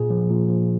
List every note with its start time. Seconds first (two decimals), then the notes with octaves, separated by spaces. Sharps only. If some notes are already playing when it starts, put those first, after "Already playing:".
Already playing: A#2 G#4
0.10 F3
0.30 A#2
0.49 F3